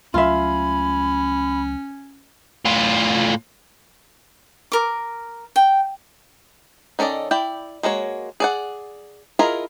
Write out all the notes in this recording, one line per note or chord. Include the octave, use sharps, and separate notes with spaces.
C#2 F#3 A3 C#4 F4 E5 B5
A2 F4
A#4 D6
G5
D#3 C#4 A4 D5 D#5
E4 D5 G5
G#3 A#3 F#4 C#5
G#4 D5 F#5
E4 F4 G#4 A#4 D#5